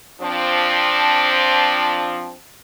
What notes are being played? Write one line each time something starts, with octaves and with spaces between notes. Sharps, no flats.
F3 C4 D4